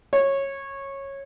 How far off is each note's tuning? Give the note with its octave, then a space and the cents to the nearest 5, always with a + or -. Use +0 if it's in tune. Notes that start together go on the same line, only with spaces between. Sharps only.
C#5 -15